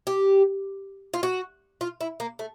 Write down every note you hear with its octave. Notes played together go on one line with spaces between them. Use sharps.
G4
F4
F#4
F4
E4
A#3
A3